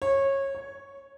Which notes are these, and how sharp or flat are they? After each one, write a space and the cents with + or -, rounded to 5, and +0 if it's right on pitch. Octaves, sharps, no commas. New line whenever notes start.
C#5 -20
C#5 +0